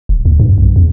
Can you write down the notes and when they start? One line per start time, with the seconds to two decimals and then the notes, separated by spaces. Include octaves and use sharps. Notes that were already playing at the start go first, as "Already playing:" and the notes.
0.09 D#1
0.25 D2
0.40 G2
0.58 B1
0.76 E2